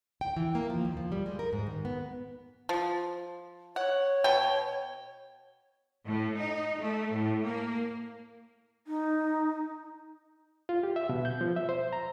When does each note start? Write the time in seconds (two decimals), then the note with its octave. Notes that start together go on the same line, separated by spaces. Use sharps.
0.21 G5
0.36 E3
0.55 A#3
0.70 F3
0.85 D#2
0.97 F3
1.12 G3
1.26 G#3
1.39 A#4
1.53 G#2
1.67 D#3
1.85 B3
2.69 F3
3.76 C#5 F#5
4.24 B2 G5
6.06 A2
6.37 D#4
6.79 A3
7.11 A2
7.45 A#3
8.87 D#4
10.69 F4
10.83 G4
10.96 E5
11.09 B2
11.25 G6
11.41 F3
11.56 E5
11.69 C5
11.93 A#5